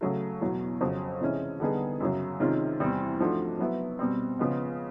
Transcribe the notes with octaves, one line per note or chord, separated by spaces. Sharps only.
C#3 F#3 A3
E2 B2 F#3
F2 C#3 F#3
C3 E3 G#3 C#4 E4
D3 G3 B3 D#4 G#4
F#2 C#3 F#3
C3 D#3 G#3 C#4 F4
E2 C3 E3 G3 C4
G#2 F3 A3 D4 F#4
F#3 B3 E4
B2 G3 C4
C#3 F3 G#3 B3